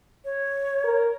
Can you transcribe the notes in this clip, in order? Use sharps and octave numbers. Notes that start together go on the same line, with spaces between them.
C#5
A#4